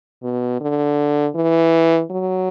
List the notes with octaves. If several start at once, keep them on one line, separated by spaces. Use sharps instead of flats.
B2
D3
E3
F#3